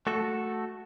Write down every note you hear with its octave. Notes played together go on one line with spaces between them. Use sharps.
A3 F#4 A4